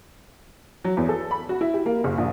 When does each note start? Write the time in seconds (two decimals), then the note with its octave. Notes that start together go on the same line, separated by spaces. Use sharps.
0.85 F#3
0.97 E2
1.09 A4
1.31 B5
1.49 F#4
1.61 E4
1.74 G4
1.86 A#3
2.04 F#1
2.18 A#1